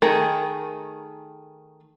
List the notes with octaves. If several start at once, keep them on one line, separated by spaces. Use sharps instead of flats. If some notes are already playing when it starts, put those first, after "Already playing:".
D#3 A3 G#4 A#4